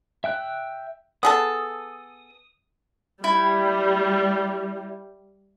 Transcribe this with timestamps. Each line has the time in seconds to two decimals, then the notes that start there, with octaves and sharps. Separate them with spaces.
0.24 E5 G5 F#6
1.23 B3 G#4 A4 D#6
3.24 G3 E4